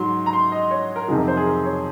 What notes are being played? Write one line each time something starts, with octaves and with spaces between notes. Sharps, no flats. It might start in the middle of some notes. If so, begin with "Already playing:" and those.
Already playing: G#2 F#3 C6
A#5
C6
D#5
C#5
A#4
F2 C3 D#3 F#3 G#4
A#4
C5
G#4
A#4
C#5